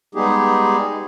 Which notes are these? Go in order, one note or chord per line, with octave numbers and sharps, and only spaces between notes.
G3 G#3 B3 D#4 G4 G#4